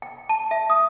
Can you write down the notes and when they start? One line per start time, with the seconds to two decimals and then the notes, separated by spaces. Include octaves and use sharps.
0.02 G5
0.29 A5
0.51 E5
0.70 D#6